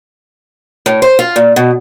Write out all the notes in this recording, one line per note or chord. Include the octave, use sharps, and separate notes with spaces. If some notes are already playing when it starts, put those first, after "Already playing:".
A2
C5
F4
A#2
B2